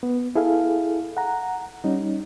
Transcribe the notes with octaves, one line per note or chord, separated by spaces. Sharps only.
B3
E4 G#4 A4 F5
F#5 A#5
G3 C#4 D#4